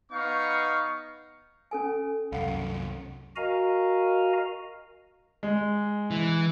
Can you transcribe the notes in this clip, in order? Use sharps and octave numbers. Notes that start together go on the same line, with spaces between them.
B3 D#4 F5 C#6
C#4 A4 G#5
C2 F#2 F5 F#5
F#4 A#4 D#5 F5 G#5 A#5
G#3
E3